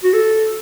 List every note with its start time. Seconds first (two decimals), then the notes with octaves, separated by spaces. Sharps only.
0.04 F#4
0.14 A4